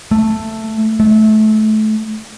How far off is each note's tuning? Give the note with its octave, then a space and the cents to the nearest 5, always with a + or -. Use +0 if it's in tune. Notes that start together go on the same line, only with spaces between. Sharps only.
A3 +5
A3 -25